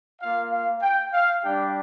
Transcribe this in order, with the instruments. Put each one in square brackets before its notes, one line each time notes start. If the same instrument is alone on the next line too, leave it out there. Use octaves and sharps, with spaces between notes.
[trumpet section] A#3 F4 F5
F5
G5
F5
G3 D4 G4 G5